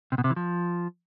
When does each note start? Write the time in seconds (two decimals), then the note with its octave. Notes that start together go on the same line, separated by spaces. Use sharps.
0.12 C3
0.18 B2
0.24 C3
0.30 E3
0.36 F3